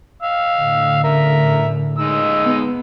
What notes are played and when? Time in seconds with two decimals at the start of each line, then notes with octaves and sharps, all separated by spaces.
0.22 F5 E6
0.58 A2 D3
1.04 A#4 E5
1.98 G#3 D#4 E6
2.43 B3